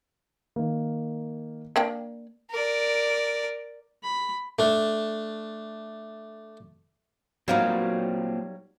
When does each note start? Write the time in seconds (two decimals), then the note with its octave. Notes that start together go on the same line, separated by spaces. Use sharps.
0.56 D#3 A#3
1.76 A#3 D4 G5
2.51 A#4 D5
4.03 B5
4.59 A3 D4
7.48 A#2 F#3 G3 B3 C4 D#4 A#4 F5